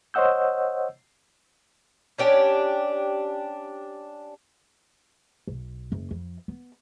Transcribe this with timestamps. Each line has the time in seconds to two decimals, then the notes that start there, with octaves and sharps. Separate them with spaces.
0.14 C5 C#5 D#5 F#5 E6 G6
2.19 C#4 D4 G4
5.47 B1
5.92 F#1
6.11 F2
6.48 B3